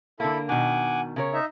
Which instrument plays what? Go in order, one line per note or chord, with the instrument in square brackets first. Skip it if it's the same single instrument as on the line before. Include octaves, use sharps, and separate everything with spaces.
[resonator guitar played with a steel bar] D3 A#3 [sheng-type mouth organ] E4 A4 B5
[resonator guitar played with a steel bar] B2 D#3 [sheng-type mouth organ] F#5 G#5 D6
[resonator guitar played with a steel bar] C#3 A#4 C#5
[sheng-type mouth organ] D#4 E5